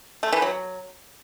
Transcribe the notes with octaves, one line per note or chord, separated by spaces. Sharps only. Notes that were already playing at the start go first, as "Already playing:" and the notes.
A3
E3
F#3